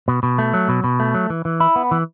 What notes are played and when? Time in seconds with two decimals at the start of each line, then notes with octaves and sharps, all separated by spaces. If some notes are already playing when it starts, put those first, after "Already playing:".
0.08 B2
0.23 B2
0.39 A3
0.54 F#3
0.69 B2
0.84 B2
1.00 A3
1.14 F#3
1.30 E3
1.45 E3
1.60 E4
1.76 B3
1.91 E3